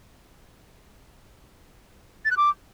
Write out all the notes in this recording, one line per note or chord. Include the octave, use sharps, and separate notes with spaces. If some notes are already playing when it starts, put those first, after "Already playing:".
A6
F#6
D6